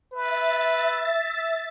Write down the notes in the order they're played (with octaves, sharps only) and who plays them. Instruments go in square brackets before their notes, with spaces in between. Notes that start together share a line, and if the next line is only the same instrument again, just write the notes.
[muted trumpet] B4 [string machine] E5 A6